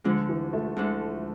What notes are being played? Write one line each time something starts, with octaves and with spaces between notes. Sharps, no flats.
D2 D3 F3 G#3 D4
E3
A3
D2 D3 G#3 D4